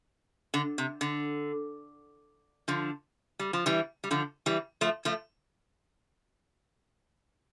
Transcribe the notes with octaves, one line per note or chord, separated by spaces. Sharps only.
D3
C3
D3
D3 F3
G3
F3
E3 G3
G3
D3 F3
E3 G3
F3 A3
F3 A3